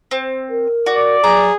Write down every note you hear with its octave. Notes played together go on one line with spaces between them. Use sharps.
C4
A#4
F#4 D5
F#3 G#4 A#5